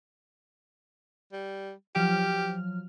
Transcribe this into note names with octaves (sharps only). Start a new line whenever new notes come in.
G3
F3 F#3 G4 F6